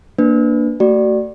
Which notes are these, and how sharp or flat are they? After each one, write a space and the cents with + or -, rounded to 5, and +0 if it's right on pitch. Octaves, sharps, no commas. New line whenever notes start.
A#3 +0 D4 +0 B4 +15
A3 +30 F#4 +35 D5 +5